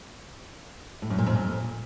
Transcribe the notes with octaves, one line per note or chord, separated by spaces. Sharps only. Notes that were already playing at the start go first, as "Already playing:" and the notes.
A2
F#2
A#2
F2
A#2